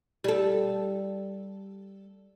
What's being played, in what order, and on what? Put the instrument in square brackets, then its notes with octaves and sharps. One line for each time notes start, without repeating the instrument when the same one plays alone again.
[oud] G3 A4